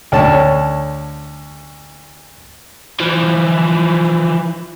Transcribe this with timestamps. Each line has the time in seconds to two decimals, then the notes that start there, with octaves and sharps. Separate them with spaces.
0.12 D2 C#4 A5
3.00 E3 F3